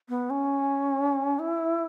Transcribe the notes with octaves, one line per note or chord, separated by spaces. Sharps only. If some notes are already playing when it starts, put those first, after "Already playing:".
B3
C#4
E4